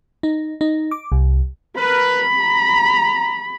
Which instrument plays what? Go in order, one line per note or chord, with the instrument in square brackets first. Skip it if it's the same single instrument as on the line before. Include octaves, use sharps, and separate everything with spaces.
[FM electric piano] D#4
D#4
D6
C2
[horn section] A#4 B4 [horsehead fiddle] B5
[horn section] A#5